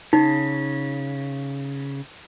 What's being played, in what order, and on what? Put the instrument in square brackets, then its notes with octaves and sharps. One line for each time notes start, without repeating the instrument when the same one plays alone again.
[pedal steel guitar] C#3 [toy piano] D#4